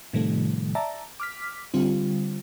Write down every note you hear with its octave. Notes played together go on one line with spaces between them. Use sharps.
A2 C3 D#3 F3 G3 A3
D5 E5 A5 A#5
D6 F6 B6
D3 G3 C4 F4